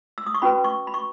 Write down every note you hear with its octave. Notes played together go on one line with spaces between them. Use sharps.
E6
D#6
C#6
C#4 F#4 B4 B5
C#6
B5
C#6